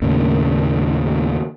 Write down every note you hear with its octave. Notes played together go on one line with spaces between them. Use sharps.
D#2 A2 C#3 A#3